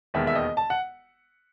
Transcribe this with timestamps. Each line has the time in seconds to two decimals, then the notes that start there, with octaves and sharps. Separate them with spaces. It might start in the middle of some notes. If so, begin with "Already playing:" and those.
0.14 E1 D#2 D#3 G#3 B3 E5
0.27 E5
0.35 D#5
0.57 A5
0.70 F#5